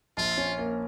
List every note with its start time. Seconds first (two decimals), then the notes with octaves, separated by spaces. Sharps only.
0.17 A#1 F4
0.37 C#4
0.58 A#3